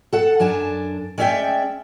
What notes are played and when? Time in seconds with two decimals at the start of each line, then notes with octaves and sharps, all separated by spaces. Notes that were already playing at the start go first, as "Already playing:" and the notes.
0.13 A4 F#5 A5
0.39 F#2 D4 G#5 A5
1.18 G#3 C#4 D5 E5 G5